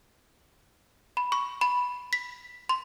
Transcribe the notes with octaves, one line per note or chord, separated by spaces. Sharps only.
B5
C#6
B5
B6
C6